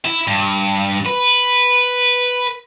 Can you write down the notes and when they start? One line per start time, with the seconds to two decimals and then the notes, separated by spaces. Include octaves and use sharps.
0.05 E4
0.28 G2
1.06 B4